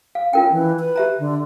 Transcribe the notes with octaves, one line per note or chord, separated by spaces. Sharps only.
F5
C#4 F4 A#4 G5
E3
B4
G4 E5 A#5
D3